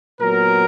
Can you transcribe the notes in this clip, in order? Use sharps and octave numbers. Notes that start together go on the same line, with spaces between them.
A#2 F#3 B3 A#4